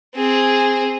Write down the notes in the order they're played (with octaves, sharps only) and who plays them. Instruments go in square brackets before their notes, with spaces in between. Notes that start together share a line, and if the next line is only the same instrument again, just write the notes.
[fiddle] C4 G#4